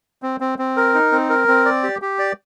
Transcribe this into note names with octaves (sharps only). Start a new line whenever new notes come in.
C4
C4
C4
A#4
D#4
C4
A#4
C4
D5
G4
G4
D5